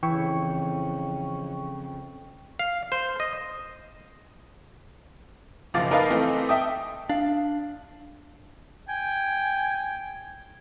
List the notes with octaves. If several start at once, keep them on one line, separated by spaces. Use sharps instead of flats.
F2 C#3 E3 G5 C#6
F5
C5
D#5
F#1 B1 F3 F5 D6 A6
D#4 A#4 B4 D#5 F5 A5
E3 A3 C4 D#4
E5 G5 A5 D#6
D4 F5
G5 G#5